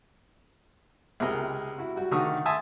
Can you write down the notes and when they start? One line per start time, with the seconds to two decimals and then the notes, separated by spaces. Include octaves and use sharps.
1.20 C#2 C3 G4 G#4 A#4 D#5
1.78 E4 F#4
1.96 G3 F#4
2.11 D3 D#3 A3 A#4 C#6 D#6
2.46 E5 G#5 A5 C6 D#6